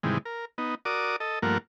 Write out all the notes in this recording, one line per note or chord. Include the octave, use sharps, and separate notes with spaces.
G#2 C3 D#3 E3 G3 G#3
A#4
B3 D#4
F#4 A#4 D5 D6 D#6
A4 D#5
G2 F3 A3 A#3 A#4 F#5